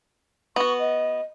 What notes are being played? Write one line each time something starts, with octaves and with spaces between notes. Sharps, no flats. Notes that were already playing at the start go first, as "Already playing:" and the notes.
B3 F#4 C#6
D#5